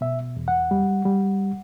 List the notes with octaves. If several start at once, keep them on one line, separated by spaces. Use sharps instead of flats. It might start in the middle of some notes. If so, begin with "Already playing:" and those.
B2 E5
E2
F#5
G3
G3